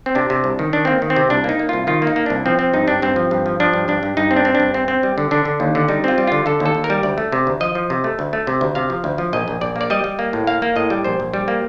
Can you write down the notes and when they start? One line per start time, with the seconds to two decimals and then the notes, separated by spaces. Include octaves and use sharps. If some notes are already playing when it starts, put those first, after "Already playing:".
0.06 C4
0.15 C3 D4
0.30 C3
0.44 C2
0.59 D#3
0.73 D#3 D4
0.85 A#3 C4
1.02 D#3
1.10 C4
1.16 C3
1.30 C2 D4
1.44 A#3 D#4
1.59 A#3
1.69 C2 F4
1.87 D#3 F4
2.02 A#3
2.07 D#4
2.16 A#3
2.26 C2 D4
2.46 F3 C4
2.59 C4
2.73 G2 D#4
2.88 G2 D4
3.02 G2 C4
3.16 F3
3.31 G2
3.46 F3
3.60 F3 D4
3.73 G2
3.88 G2 D4
4.03 G2
4.17 G2 D#4
4.31 C4
4.36 D4
4.45 C4
4.55 D4
4.60 G2
4.74 C4
4.88 C4
5.03 G3
5.18 D3
5.31 D3 D4
5.45 D3
5.60 D#2
5.75 D3
5.88 G3 D#4
6.04 C4 F4
6.18 G3
6.27 D3 F4
6.46 D3 A4
6.60 D#2
6.65 A4
6.75 D#2
6.84 A#4
6.90 G3
7.03 D2 D5
7.18 A3
7.32 C3
7.47 D2
7.60 F3 D#5
7.75 F3
7.90 C3
8.04 A3
8.19 D2
8.33 A3
8.47 C3
8.61 D2
8.75 C3 F5
8.90 F3
9.04 D2
9.18 F3
9.33 A#1 D#5
9.48 A#1
9.61 A#1 D5
9.76 A#3
9.81 D5
9.90 G3 D#5
10.04 G3
10.19 A#3
10.33 A2
10.47 A#3 F5
10.62 A#3
10.76 A2 D#5
10.90 G3
11.04 A#1 C5
11.20 A#1
11.34 G3
11.48 A#3